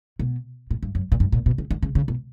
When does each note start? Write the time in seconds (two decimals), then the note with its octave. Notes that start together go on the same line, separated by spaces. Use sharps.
0.19 B2
0.71 A#2
0.83 G2
0.95 F#2
1.12 A#2
1.20 G2
1.32 A#2
1.46 B2
1.58 C#3
1.71 D3
1.83 C#3
1.95 C#3
2.08 B2